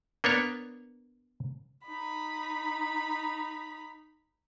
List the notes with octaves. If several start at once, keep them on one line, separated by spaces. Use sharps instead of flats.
A#3 B3 D4 C#5
D#4 B5